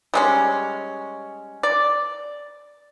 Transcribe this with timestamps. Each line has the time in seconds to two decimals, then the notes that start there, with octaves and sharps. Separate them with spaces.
0.14 G3 G#3 C#4
1.63 D5